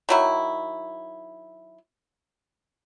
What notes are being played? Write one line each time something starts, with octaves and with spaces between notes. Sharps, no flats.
D#3 F#3 E4